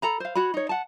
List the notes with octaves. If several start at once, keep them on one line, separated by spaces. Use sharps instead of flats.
A4 A#5 B5
C5 F5
F#4 C#5 B5
D#4 C#5
F#5 A5